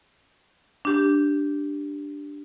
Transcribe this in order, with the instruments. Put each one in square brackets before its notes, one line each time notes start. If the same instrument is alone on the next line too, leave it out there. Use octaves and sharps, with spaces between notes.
[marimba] D4 G4